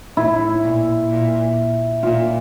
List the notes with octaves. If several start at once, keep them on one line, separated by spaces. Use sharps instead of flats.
A2 E4
A#2
A#2
A#2 F4